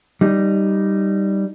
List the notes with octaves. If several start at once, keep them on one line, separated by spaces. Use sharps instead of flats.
G3 D#4